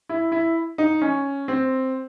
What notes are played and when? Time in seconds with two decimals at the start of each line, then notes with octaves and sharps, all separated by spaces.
0.09 E4
0.32 E4
0.78 D#4
1.02 C#4
1.48 C4